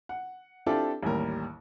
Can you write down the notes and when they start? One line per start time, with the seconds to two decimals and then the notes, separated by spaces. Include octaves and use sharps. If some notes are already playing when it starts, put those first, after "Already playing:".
0.09 F#5
0.66 C4 D4 E4 F4 G4 A4
1.03 A1 D#2 G3 A#4